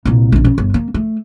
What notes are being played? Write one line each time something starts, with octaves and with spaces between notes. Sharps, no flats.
C2 A#2
A#1 C3
C#3
G1
A#3
A3